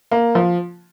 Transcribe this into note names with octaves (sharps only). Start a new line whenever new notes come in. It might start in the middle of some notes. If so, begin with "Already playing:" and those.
A#3
F3